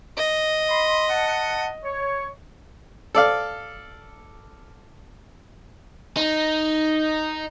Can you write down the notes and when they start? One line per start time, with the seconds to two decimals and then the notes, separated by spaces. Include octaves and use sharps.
0.18 D#5
0.69 B5 C6
1.09 F#5 A5
1.84 C#5 C#6
3.15 A4 D5 F5
6.17 D#4